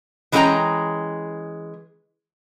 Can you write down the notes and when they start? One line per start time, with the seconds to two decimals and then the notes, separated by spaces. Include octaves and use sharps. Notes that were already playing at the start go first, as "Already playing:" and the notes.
0.32 E3 G#3 C#4 G#4 G5 A#5